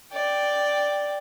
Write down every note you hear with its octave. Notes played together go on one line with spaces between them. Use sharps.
D5 G5